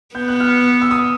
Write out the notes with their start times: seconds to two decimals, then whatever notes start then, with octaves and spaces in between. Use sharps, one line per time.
0.15 B3 G6
0.28 F#6
0.40 F6
0.82 E6
0.91 D#6